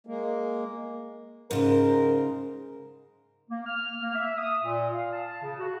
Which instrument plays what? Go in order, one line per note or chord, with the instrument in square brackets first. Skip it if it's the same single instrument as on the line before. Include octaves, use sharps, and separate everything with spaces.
[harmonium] G#3 A#3
[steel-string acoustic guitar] G#2 C#3 C5 [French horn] A#4
[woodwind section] A#3
F6
A#3
E5
D#6
A#2
F5
A5
C#3
F#4